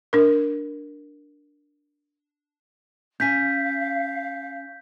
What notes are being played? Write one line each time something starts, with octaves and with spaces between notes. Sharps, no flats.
D4 A#4
C#4 F5 G#5 G6 B6